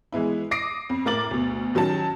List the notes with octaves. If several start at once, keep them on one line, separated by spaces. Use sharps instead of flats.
E3 G#3 B3 E4
D6 D#6 A#6 C7 D7
F2
A2 A#4 D6 A6 F#7
D2 B2
D#3 F#3 C#4 A5